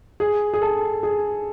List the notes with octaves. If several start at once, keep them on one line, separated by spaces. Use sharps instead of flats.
G#4
G#4
A4
G#4